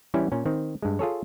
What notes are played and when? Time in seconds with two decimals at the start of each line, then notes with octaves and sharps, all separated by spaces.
0.14 E3 G3 C#4 E4
0.32 A#2 C#4
0.46 D#3 C4
0.82 G2 G#3
0.99 F4 G#4 A4 C#5